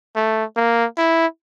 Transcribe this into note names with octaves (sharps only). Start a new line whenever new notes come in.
A3
A#3
E4